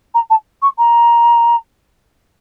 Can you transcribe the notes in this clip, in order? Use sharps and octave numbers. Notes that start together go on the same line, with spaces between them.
A#5
A5
C#6
A#5